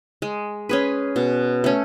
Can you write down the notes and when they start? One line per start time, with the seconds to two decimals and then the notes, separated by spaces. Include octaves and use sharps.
0.22 G#3
0.69 C#4 G#4 B4
1.16 B2
1.64 A3 C#4